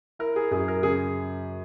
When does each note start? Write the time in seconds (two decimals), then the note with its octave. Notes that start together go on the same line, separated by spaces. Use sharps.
0.19 E4 A#4
0.36 G#4
0.51 F#2 G#4
0.68 A#4
0.83 C#3 G#4